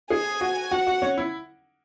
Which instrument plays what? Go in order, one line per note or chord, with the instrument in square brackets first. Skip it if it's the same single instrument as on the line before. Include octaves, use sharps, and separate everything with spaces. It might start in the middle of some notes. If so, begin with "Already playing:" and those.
[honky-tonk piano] G#4 [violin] G#5
[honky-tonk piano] F#4
[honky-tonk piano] F#4 [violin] F#5
[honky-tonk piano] F#4
C#4
E4